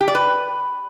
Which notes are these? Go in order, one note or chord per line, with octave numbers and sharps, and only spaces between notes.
G4
D5
B4